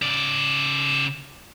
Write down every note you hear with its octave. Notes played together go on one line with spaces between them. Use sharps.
C#3 D5